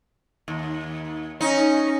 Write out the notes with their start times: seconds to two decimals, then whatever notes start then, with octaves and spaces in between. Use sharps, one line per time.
0.48 D#2
1.41 C#4 D#4